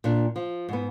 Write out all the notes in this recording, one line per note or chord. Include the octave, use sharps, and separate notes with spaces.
A#2 D4
F3
G#2 B3